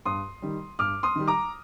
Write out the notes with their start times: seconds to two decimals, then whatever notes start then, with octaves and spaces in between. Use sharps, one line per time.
0.05 G2 C6 D#6
0.42 D#3 G3
0.79 G2 D6 F6
1.03 C6 D#6
1.16 D#3 G3
1.28 A#5 D6